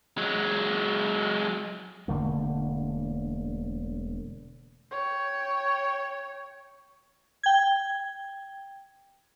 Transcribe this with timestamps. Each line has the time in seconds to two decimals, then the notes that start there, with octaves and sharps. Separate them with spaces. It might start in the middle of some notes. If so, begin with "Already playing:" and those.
0.18 F#3 G#3
2.08 E1 D3 A3 A#3
4.91 C#5 G5
7.43 G5 G#6